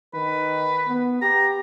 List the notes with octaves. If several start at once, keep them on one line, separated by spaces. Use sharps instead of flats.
D#3 B4
B3
G4 A#5